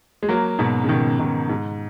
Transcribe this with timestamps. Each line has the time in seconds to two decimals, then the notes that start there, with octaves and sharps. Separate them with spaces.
0.23 G#3
0.29 F#3 A#3
0.59 G#2 B2
0.84 C#3
0.89 B2 D#3
1.19 B2 D#3
1.49 G#2